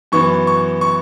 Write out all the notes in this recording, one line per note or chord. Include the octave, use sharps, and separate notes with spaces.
F#2 E3 B3 C#6
C#6
C#6